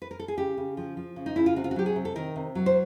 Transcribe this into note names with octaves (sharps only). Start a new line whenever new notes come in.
B4
A#4
A4
G#4
C#3 G4
C#3
F3
F3
C#3
D#4
C#3 E4
F4
C3 F#4
F4
F#4
F#3 G4
G#4
C3
A4
D#3 A#4
C3
F#3
C5